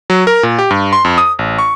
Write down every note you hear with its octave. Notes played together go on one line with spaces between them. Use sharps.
F#3
A#4
A#2
G4
G2
C6
F2
D#6
A1
C#6